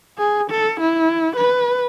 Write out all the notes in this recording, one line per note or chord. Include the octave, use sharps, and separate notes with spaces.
G#4
A4
E4
B4